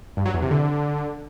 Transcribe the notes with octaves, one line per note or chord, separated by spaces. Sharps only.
G2
F#3
E2
C3
D3